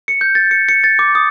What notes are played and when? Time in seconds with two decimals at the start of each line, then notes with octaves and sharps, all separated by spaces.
0.08 C#7
0.21 G6
0.35 A6
0.51 C#7
0.69 C#7
0.84 A6
0.99 D6
1.15 D#6